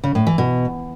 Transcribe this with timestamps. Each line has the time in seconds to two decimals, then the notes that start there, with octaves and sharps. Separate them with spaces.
0.04 C#3
0.15 A2
0.27 E3
0.38 B2